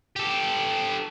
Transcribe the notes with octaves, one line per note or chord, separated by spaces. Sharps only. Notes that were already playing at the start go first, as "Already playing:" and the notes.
G4 A4